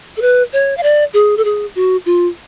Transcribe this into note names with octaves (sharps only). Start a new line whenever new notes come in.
A4
B4
C#5
F5
D5
G#4
A4
G#4
F#4
F4